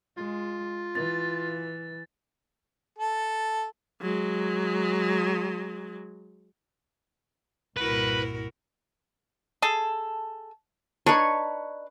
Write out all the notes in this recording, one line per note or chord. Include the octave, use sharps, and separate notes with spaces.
G#3 F4
E3 A6
A4
F#3 G#3
C2 G2 A#2 E4 F#4 A#4 B4
G#4 A4
D4 D#4 B4 C#5